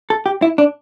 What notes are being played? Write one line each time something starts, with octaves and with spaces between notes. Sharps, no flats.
A4
G4
E4
D4